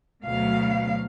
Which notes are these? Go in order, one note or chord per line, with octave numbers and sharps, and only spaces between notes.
D2 B2 F#3 F5